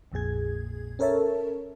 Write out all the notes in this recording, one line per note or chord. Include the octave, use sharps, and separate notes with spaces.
A#1 F2 A#2 G#4 G#6
C#4 A4 A#4 C#5 E5 A5